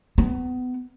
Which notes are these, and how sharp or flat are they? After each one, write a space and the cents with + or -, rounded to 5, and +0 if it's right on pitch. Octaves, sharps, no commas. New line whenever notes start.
B3 +25